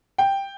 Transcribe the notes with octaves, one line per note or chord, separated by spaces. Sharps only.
G5